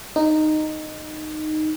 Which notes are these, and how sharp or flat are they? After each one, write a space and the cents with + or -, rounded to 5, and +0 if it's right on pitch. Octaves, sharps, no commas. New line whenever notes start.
D#4 -10